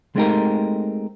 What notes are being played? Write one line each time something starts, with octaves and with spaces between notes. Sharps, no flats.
G#3 A3 C4 D#4 G4 A#4